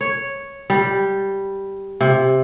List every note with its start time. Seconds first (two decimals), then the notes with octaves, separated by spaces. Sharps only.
0.01 C#5
0.70 G3
2.01 C3